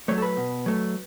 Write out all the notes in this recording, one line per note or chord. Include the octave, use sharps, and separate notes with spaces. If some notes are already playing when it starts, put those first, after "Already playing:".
F#3 A3 C#5
A4
B4
B2
F#3 A3